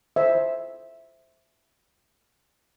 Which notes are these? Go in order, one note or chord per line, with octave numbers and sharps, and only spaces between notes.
C5 E5